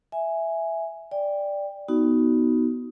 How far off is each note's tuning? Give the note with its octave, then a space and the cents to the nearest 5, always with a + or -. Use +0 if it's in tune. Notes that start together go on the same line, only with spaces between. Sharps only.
E5 +0 G#5 +0
D5 +0 G5 +15
B3 +0 D#4 +10 F#4 +20